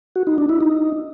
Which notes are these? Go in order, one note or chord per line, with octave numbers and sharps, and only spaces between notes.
F#4
D#4
D4
E4
D#4